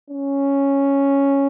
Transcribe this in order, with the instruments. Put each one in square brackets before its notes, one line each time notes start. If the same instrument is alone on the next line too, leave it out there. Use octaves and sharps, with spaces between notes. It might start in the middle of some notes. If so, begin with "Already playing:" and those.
[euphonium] C#4